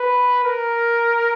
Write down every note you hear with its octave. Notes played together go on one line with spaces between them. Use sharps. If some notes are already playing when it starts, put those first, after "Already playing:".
Already playing: B4
A#4